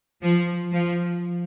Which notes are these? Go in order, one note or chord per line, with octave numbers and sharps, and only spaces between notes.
F3
F3